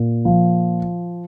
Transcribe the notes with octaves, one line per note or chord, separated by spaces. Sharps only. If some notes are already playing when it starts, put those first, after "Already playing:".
Already playing: A#2
F3